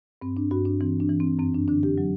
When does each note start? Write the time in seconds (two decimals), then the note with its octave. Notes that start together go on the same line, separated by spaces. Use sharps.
0.22 G2 C4
0.37 D4
0.51 G2 F#4
0.65 D4
0.81 E3 C4
1.00 D4
1.09 E3
1.20 C4
1.39 F#2 C4
1.54 D4
1.68 D3 D4
1.83 G4
1.98 F#3